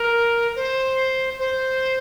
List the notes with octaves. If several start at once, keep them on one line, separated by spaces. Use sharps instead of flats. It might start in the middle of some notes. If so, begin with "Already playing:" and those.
Already playing: A#4
C5
C5